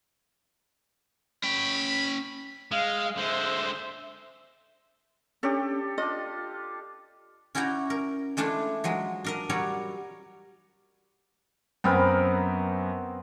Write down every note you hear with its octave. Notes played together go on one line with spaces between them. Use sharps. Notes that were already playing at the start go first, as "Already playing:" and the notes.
C#4 G5 B5
G#3 F5
D3 G#3 C5 E5
C#4 D4 G4 A4
D4 F4 D#5
C#4 E4 F#4 D5 G5 A#5
A#4
G#3 A3 D4 E4 F4
F3 F#3 G#3
D4 A#4 D#5
F#3 G3 A#4 C#5 D5
F#2 B3 C4 A#4 B5